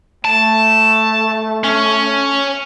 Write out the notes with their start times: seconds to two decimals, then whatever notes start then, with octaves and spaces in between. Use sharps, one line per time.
0.25 A3 A5
1.64 C#4